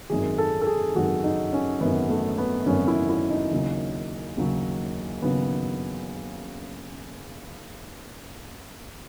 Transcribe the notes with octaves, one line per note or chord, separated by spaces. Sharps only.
G#1 F#2 D#3 F#3 G#4
A4
A4
G#4
G#1 F#2 D#3 F#3 F#4
D#4
C#4
G#1 F#2 D#3 F#3 B3
A3
B3
G#1 F#2 D#3 F#3 C#4
E4
E4
D#4
D#2 C#3 F#3
D#2 C#3 F#3
D#2 C#3 F#3 B3